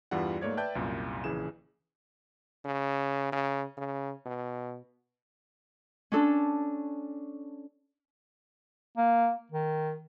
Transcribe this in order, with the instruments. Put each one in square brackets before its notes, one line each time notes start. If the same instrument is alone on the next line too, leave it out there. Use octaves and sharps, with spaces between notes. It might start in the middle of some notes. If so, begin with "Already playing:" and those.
[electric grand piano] E2 G2 E3 G3 F4 F#5
G#2 A3 A#3 C#5 D5 G#6
B4 D5 E5 G5 A5 G6
C2 F#2 A#2
A#1 C#3 E3 G#4 E7
[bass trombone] C#3
C#3
C#3
B2
[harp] C#4 D4 A4
[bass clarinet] A#3
D#3